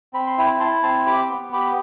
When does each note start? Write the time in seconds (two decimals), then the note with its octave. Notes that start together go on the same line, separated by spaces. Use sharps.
0.13 C4 B5
0.27 C6
0.38 E4 G5 B5
0.60 E4 A5 C6
0.83 C4 A5 C6
1.06 G4 B5 D6
1.30 B3
1.53 G4 B5 D6